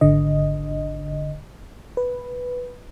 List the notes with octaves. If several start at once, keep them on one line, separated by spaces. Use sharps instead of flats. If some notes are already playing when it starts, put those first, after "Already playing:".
G#1 D3 D#5
B4